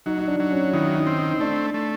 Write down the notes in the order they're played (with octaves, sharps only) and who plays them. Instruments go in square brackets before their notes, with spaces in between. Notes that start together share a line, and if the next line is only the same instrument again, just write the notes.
[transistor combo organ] F#3 [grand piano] D#4
[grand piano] D#4
D4
[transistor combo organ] F#3
[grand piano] C#4
[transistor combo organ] D#3 [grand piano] E4
[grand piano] D#4
[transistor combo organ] C4
[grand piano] D#4
D#4
[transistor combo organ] A3 [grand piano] D4
[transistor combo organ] A3